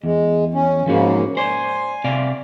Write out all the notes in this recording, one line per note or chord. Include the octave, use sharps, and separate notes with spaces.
E2 G#3
C#4
G#2 C#3 F3 A#3 C#4 F#4
C5 D5 G#5
C3 D5 F5